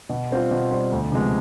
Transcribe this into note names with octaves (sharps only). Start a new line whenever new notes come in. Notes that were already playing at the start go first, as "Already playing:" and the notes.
B2
G3 C4 F4
B2
G3 C4 F4
D2
C3 F3 G#3 B3